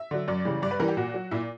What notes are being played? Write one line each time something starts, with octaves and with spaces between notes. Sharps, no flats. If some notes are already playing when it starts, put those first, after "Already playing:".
Already playing: E5
D3 F#3
F#2 D5
C#3 E3 G3
G2 D5
B4
E3 G3 A#4
G4
A#2 F#4
F#3
A#2 E4